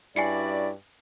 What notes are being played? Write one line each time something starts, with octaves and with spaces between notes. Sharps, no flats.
G2 C#4 E4 F#4 D5 G#5 C7 C#7